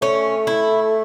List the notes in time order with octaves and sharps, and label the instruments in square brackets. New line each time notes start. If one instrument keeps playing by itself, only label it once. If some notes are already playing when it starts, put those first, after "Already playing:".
[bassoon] A3 [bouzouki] C#4
[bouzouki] E4